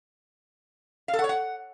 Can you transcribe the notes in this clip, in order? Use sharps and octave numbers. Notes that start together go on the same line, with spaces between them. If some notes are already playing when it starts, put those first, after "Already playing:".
F5
A4
F#5
C#5
F#5